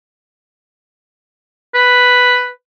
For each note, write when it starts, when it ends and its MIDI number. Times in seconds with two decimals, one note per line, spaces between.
1.74 2.50 71